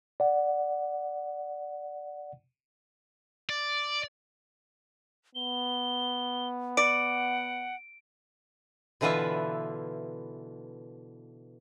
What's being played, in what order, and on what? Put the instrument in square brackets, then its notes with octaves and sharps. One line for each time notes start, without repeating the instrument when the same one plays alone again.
[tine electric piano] D5 F#5
[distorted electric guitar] D5
[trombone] B3 [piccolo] G7
[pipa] D5 [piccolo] F#5 [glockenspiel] D7
[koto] B2 D3 E3 F4 B4 E5